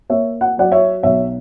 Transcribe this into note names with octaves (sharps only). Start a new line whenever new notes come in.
A#3 C#5 E5
F#5
F#3 D5 F#5
C#5 E5
B1 C#5 E5